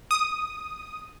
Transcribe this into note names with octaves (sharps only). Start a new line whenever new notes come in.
D#6